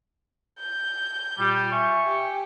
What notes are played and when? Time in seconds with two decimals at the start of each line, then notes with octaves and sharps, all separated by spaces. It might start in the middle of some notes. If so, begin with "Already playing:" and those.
0.59 G6
1.38 A#2 G3
1.71 E5 G#5 C#6
2.07 G4